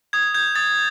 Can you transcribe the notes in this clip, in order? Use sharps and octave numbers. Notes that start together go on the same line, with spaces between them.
D#6 G#6
G6 G#6
D#6 A6